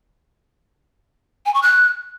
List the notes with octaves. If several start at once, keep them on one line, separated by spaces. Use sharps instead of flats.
G#5
C#6
F#6